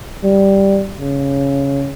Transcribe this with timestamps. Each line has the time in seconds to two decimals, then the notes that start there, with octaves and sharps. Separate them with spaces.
0.24 G3
1.00 C#3